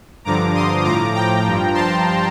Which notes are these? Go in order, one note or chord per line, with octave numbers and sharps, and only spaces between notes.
G2 D3 F3 A#5 D6
C6 D#6
A2 F3 A#5 D6
G5 A#5
G2 F3
A5 C6